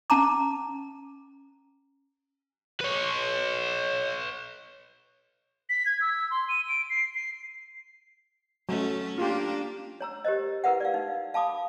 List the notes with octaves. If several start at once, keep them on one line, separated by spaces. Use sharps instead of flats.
C#4 A5 A#5 D6
B4 C#5
B6
G#6
E6
C6
D#7
D7
C7
C7
F#3 A3 C#4
A#3 D4 F4 G4
C#5 A#5 E6
G4 A#4 C5 D#5
E4 G#4 A#4 B4 E5 F#5
D5 F5
D#4
F5 A5 B5 D6 D#6